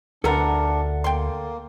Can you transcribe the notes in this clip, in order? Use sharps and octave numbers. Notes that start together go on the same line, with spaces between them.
D2 B3 D4 F4 A4 A#4 D5 F#5
A#3 G5 C6